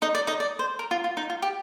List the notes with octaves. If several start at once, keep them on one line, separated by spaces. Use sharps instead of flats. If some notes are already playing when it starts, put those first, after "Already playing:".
D#4 D#5
D5
D#4 D#5
D5
C5
A#4
F4
F4
D#4
F4
G4